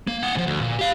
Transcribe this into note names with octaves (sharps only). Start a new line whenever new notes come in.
A#3
A#3 F#5
A2 F3
D2
A#2
G4 F5